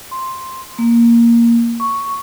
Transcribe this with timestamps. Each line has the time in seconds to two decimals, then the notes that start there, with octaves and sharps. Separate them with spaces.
0.11 C6
0.79 A#3
1.80 C#6